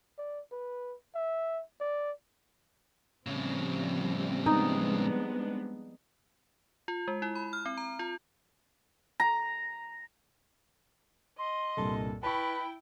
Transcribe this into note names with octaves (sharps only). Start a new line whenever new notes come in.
D5
B4
E5
D5
A2 C#3 F3 G3 C4
G#3 B3 D4 D#4
F4
G#3
E4
B5
F6
C4
A#5
F4
A#5
D#5 C6
C2 G2 A#2 A4
E4 B4 G5 A5 B5 C#6